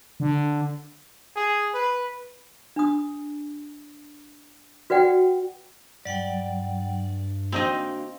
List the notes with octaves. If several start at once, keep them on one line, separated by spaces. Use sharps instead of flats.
D3
G#4
B4
D4 D#6
F#4 B4 D5 F#5 G5
G2 F#3 D5 F#5 G5
A#3 C4 D4 D#4 F#4 D#5 F5